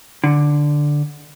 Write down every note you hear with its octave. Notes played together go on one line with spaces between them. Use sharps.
D3